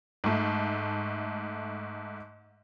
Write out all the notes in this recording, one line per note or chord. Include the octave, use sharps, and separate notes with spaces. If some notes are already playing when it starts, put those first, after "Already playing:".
G#2 A3